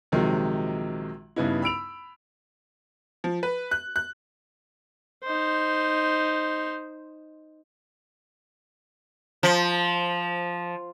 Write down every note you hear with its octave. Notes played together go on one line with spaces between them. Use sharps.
A#1 C3 D#3 F3 F#3 G#3
G2 C#3 B3 D#4 E4
B5 E6 D7 F7
F3
B4
F#6
F#6
D#4 C5
F3